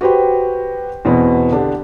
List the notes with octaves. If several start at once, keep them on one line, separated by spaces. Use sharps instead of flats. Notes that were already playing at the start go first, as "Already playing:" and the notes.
F#4 G4 B4 C5 G5
E2 B2 C4 B4 B5
D3 D4 G4